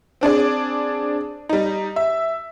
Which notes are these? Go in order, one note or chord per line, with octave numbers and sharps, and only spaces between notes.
C4 D4 G#4 D5
G3 D#4
E5